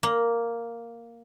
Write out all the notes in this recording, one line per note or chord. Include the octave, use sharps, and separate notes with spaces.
A#3